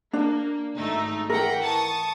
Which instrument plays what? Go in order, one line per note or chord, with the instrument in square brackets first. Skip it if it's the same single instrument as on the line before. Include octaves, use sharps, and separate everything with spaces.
[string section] A#3 [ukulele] D4
[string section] G#1 A3 D#4
[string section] E3 F#5 G5 [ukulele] A#4
[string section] A5 C#6 D#6